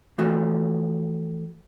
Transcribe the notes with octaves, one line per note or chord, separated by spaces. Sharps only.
E3 F3 A3 F#4